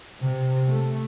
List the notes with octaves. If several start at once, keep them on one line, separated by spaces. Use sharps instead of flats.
C3
A3